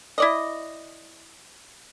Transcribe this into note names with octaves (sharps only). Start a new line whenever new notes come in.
E4 D5 D#5